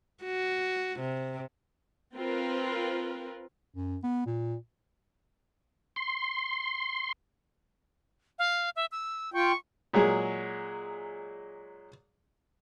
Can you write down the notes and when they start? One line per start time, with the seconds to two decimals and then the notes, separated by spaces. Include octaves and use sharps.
0.24 F#4
1.00 C3
2.15 C4 F4 A#4 B4
3.75 F#2
4.03 B3
4.26 A#2
5.96 C6
8.39 F5
8.76 E5
8.92 E6
9.34 F4 G5 C#6
9.93 A#2 F#3 G#3 G#4